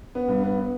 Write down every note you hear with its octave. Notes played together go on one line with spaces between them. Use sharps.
B3
G2
B3
B3